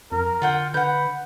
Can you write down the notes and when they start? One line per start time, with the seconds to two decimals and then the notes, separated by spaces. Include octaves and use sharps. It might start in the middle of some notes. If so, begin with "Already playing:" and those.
0.12 F2 A#4
0.42 D3 F4 F#5 G5
0.74 D3 B4 F#5 G6